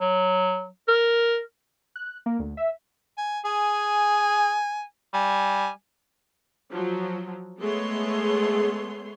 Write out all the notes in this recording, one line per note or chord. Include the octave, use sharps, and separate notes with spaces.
F#3
A#4
F#6
A#3
D2
E5
G#5
G#4 G#5
G3 G#5
F3 F#3
G#3 A3 B3 G#4 C#5 C6